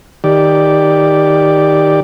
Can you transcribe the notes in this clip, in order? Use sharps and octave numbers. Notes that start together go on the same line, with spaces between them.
D#3 G4 D5